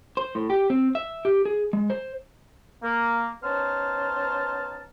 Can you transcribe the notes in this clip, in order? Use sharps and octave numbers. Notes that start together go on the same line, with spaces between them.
C5
A2
G4
C4
E5
G4
G#4
G#3
C5
A#3
B3 C#4 D#4 C5 A5 F6